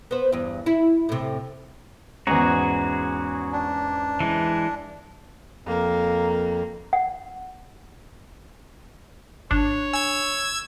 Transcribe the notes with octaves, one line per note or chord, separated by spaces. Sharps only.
B3 C5
E2 G2
E4
A2 C3
E2 G#2 C#4 F#4 G#4 A#5
D4
E3 G#3
F2 A#3
F#5
G#1 D4 C#5
G#5 E6 G#6